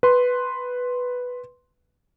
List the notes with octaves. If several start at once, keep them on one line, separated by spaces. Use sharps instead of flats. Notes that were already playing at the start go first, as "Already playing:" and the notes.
B4 C6